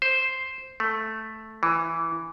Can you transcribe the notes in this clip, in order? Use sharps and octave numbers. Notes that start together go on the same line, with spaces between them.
C5
A3
E3